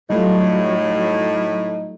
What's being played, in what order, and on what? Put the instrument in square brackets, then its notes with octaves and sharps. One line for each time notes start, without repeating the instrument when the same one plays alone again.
[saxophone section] A2 [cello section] F#3 [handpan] G3 A3 F4 [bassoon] D#4